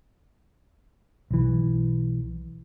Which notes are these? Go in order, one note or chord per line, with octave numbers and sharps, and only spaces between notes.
B1 E3